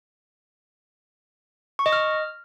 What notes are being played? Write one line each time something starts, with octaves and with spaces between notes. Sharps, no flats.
C#6
D#5
F6